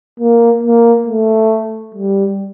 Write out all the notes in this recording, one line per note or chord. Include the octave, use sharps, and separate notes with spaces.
A#3
A#3
A3
G3